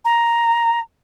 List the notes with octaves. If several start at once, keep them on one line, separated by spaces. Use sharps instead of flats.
A#5